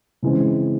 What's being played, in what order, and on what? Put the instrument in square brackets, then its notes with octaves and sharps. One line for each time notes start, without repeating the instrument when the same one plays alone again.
[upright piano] C#3 E3 G#3 C4